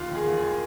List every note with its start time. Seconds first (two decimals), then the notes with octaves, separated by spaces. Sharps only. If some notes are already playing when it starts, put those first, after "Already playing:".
Already playing: D#2 F4
0.10 D#3 G#4
0.27 D#2
0.37 G#4
0.43 D#3